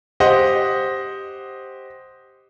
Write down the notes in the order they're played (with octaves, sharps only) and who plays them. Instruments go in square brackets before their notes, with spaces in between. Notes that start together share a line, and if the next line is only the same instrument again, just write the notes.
[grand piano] G4 C5 D#5 F#5